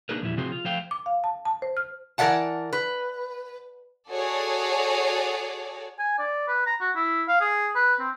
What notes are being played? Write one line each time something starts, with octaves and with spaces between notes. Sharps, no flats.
A#3 D4 D#4 G#4 A#4 B4
E2 A#2 F3 G3 E4
C3 F3 C4 F#4 G#4 C5
F4
F3 A3 C5 F5 G5
D6
F5
A5
A5
C5
F6
E3 A#4 D5 E5 F#5 A5
B4
F#4 G#4 A4 C#5 D5
G#5
D5
B4
A#5
F#4
E4
F5
G#4
B4
C4